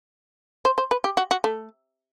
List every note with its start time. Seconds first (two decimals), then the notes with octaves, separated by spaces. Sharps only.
0.65 C5
0.78 C5
0.91 B4
1.04 G4
1.17 F#4
1.31 F#4
1.44 A3